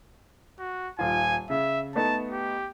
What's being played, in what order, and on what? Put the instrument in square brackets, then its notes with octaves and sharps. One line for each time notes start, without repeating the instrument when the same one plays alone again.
[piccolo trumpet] F#4
[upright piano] D#1 F4 [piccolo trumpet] G#5
[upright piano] C#3 [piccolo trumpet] E5
[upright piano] A3 B3 D#4 [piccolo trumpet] A5
[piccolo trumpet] G4